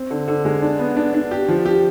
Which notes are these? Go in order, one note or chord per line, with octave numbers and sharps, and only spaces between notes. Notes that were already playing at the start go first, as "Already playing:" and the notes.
Already playing: C4
D3
D3
G#3
D4
B3
D4
D4
G4
F3
G4